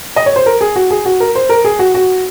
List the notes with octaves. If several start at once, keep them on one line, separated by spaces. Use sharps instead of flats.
D#5
C#5
C5
A#4
G#4
F#4
G#4
F#4
A#4
C5
A#4
G#4
F#4
F#4